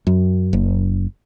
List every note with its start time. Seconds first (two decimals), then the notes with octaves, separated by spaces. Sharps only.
0.07 F#2
0.53 F#1